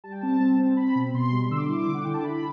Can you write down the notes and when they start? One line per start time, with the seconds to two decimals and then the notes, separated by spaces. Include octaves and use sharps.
0.04 G3 A5
0.12 G5
0.21 C4 A5
0.40 C4
0.60 C4
0.77 C4 B5
0.95 B2
1.14 B2 C6
1.32 G3
1.50 D3 E6
1.57 D6
1.65 C6
1.69 E4 D6
1.87 D3
1.94 F#5
2.05 D3 G5
2.14 A5
2.24 E4 B5